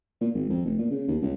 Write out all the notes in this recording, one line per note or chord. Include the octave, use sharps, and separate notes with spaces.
A#2
G#1
F2
F1
A#2
C#3
D#2
C#2